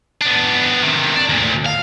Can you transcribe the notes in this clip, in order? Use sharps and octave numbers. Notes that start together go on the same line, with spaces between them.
B3 D4
C3 D#3
D4
D2 A#2
F5